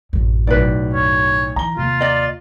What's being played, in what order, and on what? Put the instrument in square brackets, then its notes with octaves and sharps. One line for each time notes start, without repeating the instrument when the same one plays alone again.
[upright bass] A1 F#2
[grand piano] B1 A2 [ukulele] B4 D5
[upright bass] F#2 [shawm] C#5
[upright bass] E3 [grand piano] A#5 G7
[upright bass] D#2 C3 [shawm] F4
[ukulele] D5 D#5